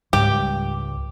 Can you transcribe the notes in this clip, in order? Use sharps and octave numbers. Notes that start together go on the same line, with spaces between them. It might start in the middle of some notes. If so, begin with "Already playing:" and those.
C#2 G#2 G3 G4